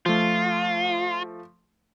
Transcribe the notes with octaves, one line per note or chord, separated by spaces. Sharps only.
F3 A3 F4